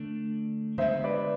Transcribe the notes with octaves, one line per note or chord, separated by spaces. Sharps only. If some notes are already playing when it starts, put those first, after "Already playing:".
Already playing: D3 A3 D4
D3 G#3 B3 C5 E5
B4 D5